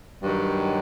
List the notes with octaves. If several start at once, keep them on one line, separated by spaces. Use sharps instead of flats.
G2 D#3 F#3